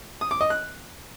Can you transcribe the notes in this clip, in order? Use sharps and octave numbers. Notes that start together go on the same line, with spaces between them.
D#6
D6
D#5
F#6